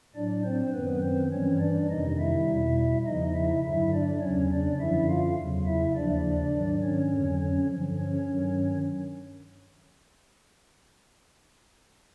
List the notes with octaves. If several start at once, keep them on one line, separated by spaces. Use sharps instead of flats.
A2 F#3 D4 D5
C4 C5
F#2 D#3 F#3 B3 B4
C4 C5
G2 E3 G3 C#4 C#5
D4 D5
F2 C3 D#3 G3 D#4 D#5
E4 E5
E2 B2 G3
E2 C#3 F3 D#4 D#5
E4 E5
G2 D3 F#3 E4 E5
D4 D5
E2 C#3 F#3 C#4 C#5
D4 D5
F#2 D3 F3 E4 E5
F4 F5
E2 C#3 F#3
E4 E5
D#2 C#3 F3 D4 D5
G#2 D#3 F#3
C#4 C#5
F2 D3 F#3
C#4 C#5
G2 D3 F3
C#4 C#5
G2 D#3 F#3